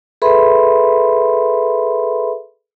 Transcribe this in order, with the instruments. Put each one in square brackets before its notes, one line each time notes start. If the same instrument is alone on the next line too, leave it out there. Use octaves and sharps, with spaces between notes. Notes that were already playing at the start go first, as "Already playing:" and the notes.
[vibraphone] G#4 A4 B4 E5 B5 C6